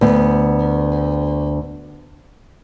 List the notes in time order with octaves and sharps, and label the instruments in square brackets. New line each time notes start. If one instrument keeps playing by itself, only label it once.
[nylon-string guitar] D2 B3